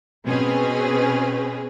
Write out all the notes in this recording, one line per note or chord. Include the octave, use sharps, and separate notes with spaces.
B2 C4 C#4 G#4 B4